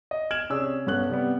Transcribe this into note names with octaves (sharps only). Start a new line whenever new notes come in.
D#5
F6 G#6 D7 E7 F#7
C3 C#4 G#4 D5 E6
G2 B3 C#4 A4 F#6 F#7
C3 G3 B3